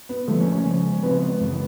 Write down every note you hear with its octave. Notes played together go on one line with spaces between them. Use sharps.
B3
D3 F3 A3 A#3
C#4
C#4
C#3 F3 G#3
C#3 F3 G#3 B3 C4
F#2 C#3 E3 G#3